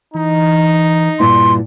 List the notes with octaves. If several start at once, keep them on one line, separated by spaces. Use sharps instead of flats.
E3 D#4
G2 A#2 E4 C6